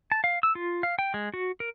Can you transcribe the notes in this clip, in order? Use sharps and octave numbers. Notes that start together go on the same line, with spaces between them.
A5
F5
E6
F4
F5
G5
G#3
F#4
A#4